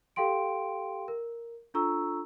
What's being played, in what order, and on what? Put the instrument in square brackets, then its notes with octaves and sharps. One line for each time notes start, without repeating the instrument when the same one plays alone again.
[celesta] G4 A4 F5 G5 C6 D7
A#4
D4 F4 A4 A#5 C#6 E6